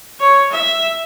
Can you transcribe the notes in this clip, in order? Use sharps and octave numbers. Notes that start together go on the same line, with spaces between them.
C#5
E5